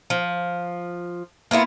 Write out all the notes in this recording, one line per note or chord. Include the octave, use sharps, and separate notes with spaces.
F3
A#3 B3 E4 F4